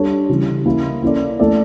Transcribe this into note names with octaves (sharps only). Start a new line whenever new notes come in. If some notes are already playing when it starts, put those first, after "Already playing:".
Already playing: G3 D4 A4 C#5
C#3 E3 G3 C#4
A#3 C#4 E4
A#3 C#4 E4 A4 D5
A3 E4 A4 D5